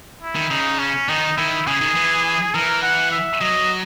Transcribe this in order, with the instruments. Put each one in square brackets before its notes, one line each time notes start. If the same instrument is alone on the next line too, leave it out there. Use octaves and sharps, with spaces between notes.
[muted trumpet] E4
[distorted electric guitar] D#3
[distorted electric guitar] C#3 [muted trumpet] D#4
[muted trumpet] C#4
[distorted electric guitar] D#3 [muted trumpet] D#4
[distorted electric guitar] D#3 [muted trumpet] E4
[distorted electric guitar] C#3 [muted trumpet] G#4
[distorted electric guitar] D#3
E3
[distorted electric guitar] E3 [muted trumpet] A#4
[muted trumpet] F#5
E5
[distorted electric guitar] F#3 [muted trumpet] D#5